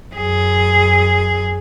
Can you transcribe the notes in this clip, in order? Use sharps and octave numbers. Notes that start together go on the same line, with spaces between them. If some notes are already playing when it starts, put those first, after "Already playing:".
F#2 G#4